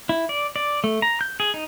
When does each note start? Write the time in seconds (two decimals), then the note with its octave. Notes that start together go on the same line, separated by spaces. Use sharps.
0.09 E4
0.29 D5
0.56 D5
0.84 A3
1.02 A#5
1.21 G6
1.40 G#4
1.54 D#4